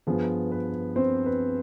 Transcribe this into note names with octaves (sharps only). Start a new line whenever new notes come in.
G2 F3 B3 G#4
B4
C4 C5
B4